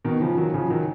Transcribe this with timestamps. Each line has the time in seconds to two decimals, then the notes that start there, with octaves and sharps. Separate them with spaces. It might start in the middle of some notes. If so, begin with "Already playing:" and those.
0.04 B2 D#3
0.21 C#3 F3
0.37 D#3 F#3
0.54 C#3 F3
0.70 D#3 F#3